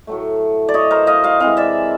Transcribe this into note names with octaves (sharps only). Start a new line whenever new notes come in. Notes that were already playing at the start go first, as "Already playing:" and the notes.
A2 F#3 A3
D5
C#5 D#5
A#4 C5
D#5 F5
D#5 F5
C3 E3 G#3 D#5 F5
D5 E5